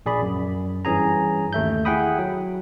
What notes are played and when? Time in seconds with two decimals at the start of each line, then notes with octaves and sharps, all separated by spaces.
0.06 A#1 G#4 D5 B5
0.22 F#2
0.85 G2 E3 C#4 G#4 G#5 A#5
1.53 D#2 A3 E5 G6
1.85 E4 G#4 F#5 G5 B5 D#6
2.19 F#3